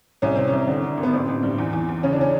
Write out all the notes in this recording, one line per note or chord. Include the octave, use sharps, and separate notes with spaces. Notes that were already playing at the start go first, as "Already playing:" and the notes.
C2 C#4
C3 C4
C2 C#4
D3
D3
G#1
B3
A1 C4
A1
G2
E2
E2
E2
C#3 C#4
D4
C#3 C#4